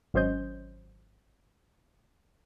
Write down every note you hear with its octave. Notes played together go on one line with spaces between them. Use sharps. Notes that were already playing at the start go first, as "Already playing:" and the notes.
G#1 F#3 C#4 C5 D#5 G6